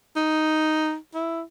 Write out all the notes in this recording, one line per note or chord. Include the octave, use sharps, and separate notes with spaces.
D#4
E4